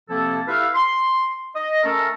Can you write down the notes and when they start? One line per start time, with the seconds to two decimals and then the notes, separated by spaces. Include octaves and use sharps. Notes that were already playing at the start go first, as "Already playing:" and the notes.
0.09 C3 F3 A#3 C4 E4 A4
0.48 E4 G4 A4 B4 E5 F5
0.75 C6
1.55 D#5
1.83 A3 C#4 A4 A#4